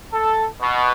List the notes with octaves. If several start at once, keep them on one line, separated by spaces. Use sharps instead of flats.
A4
B2